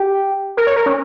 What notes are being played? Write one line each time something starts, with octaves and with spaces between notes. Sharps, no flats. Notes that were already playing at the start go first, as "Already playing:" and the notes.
Already playing: G4
A#4
C#5
A#4
C#4